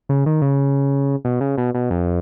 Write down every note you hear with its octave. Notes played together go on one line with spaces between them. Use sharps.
C#3
D#3
C#3
B2
C#3
B2
B2
F2